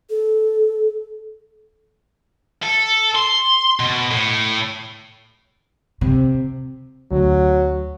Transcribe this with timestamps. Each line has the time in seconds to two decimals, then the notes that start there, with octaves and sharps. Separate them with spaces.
0.10 A4
2.63 A4
3.15 C6
3.80 B2
4.11 A2
6.01 C3
7.12 D2 F#3